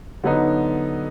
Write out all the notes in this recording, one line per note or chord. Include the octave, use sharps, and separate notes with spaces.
D3 F#3 B3 D#4